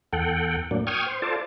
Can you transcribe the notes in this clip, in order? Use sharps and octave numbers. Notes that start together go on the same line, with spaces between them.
E2 A4 F#5 G5
A2 F#3 A#3 D4
G5 C#6 D#6 F6 G#6
C5
F4 A4 C5 D5 A5